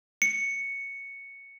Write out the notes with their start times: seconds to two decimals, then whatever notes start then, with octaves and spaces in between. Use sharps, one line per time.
0.22 C#7